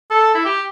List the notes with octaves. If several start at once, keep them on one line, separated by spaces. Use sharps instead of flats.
A4
E4
G4